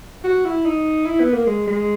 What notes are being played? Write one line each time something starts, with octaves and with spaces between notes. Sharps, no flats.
F#4
E4
D#4
E4
B3
A#3
G#3
G#3